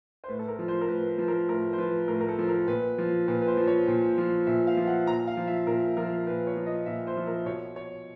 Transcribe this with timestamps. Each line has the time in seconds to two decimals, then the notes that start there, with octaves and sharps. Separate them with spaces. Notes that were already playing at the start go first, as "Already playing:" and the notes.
0.24 C5
0.28 A2 B4
0.39 A4
0.48 A#4
0.59 F3
0.68 C5
0.81 A#4
0.88 A2 B4
1.08 B4
1.18 F3
1.28 A#4
1.49 A2 A#4
1.73 C5
1.78 F3 B4
2.08 A2 A#4
2.21 A#4
2.28 A4
2.39 F3
2.48 A#4
2.67 A#2 B4
2.98 F3
3.28 A#2 B4
3.42 B4
3.48 C5
3.57 F3
3.68 C#5
3.88 A#2
4.18 F3
4.47 A#2 E5
4.67 F5
4.77 F3
4.88 F#5
5.07 A#2 A#5
5.27 F5
5.37 F3
5.48 E5
5.67 A#2 A#4
5.97 F3 A#4
6.27 A#2 B4
6.47 C#5
6.57 F3
6.66 D#5
6.86 A#2 E5
7.07 C5
7.17 F3
7.27 A#4
7.46 B2 C#5
7.76 C#5